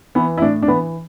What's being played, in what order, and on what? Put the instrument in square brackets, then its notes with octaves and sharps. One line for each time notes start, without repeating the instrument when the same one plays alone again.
[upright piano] E3 B3
E4
A2 D4
D4
E3 B3